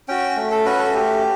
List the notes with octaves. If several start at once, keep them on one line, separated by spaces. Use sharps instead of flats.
C#4 F#4 G5
A3
A4
C#4 F#4 B4
A4
A3 G4